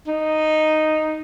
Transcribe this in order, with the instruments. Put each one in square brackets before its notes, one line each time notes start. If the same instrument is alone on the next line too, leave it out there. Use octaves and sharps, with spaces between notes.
[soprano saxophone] D#4